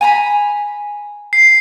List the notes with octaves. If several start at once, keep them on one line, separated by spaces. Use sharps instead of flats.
G#5 A#5 B5
C7